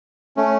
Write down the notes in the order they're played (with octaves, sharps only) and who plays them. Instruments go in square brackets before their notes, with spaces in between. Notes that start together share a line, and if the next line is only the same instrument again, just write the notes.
[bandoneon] A3 C#4